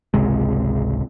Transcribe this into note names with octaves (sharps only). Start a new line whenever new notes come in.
G#1 C#2 C3 G#3